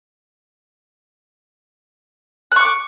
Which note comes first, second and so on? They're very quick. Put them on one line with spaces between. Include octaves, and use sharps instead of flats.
F#6 C#6 D6